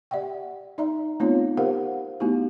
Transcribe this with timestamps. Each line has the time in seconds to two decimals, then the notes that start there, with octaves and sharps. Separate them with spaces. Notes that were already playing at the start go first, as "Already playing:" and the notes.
0.11 G4 D5 E5 F#5 G5
0.78 D#4 D5 E5 A#5
1.20 A3 B3 C4 D#4 F4 C#5
1.57 G4 A#4 C5 F5 F#5
2.20 A3 B3 D#4 E4 F#4 G4